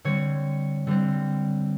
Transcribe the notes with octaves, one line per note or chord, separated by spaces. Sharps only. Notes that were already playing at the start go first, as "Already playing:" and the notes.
D3 G3 C4 C#5
D3 G3 C4